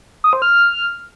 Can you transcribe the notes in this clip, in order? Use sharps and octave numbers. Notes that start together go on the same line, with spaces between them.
D#6
C5
F6